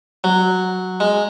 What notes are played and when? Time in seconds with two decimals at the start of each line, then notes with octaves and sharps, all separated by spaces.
0.24 F#3
1.00 G#3